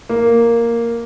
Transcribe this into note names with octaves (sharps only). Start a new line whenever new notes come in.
A#3